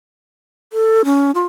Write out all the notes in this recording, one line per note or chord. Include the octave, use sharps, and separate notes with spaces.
A4
C#4
F4